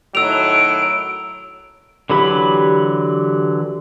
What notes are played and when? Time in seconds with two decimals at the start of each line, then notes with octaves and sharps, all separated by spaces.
0.15 A2 D#3 F#3 E6 D7 F7
2.10 D3 E3 F#3 G4 B5